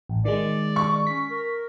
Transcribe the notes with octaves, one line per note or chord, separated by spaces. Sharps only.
A1
D#3 G#3 D5
C#6
C#4 B6
A#4